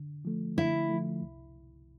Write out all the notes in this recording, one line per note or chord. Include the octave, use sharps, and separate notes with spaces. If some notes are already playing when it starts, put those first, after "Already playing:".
Already playing: D3
F3 A3
D3 E4
F3 A3
C2